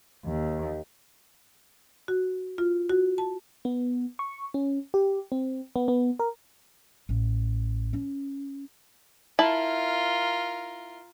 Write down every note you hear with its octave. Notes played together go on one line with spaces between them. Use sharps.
D#2
F#4
F4
F#4
A5
B3
C#6
C#4
G4
C4
B3
B3
A#4
A1
C#4
E4 F4 A#4 A5